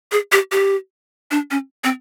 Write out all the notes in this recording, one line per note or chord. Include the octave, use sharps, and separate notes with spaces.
G#4
G4
G4
D4
C#4
C4